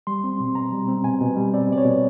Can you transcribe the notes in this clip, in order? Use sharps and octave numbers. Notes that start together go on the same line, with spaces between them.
G3 C6
C4
B2
B2 A#5
G3
C4
B2 G#5
B2
G3
C4 D5
B2 D5
C#5
B2